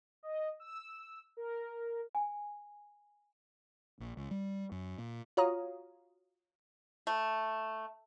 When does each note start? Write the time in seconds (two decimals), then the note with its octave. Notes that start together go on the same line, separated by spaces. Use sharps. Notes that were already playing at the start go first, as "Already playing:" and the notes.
0.23 D#5
0.60 E6
1.37 A#4
2.15 G#5
4.00 A#1
4.17 C#2
4.31 G3
4.72 F#2
4.98 A#2
5.37 F4 F#4 C#5 F5 A#5 D#6
7.07 A3